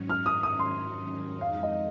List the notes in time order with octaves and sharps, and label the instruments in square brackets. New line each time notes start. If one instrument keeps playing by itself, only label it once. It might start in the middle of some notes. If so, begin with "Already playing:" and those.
Already playing: [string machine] G#2 D#3 F#3 C#4
[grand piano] F6
D#6
D#6
C6
[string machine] F2 D#3 G#3 D#4 [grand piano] F5
[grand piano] D#5